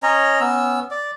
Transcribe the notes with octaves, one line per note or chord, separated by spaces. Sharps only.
C#4 C#5 D#5 A#5
B3 C#4 E6
D5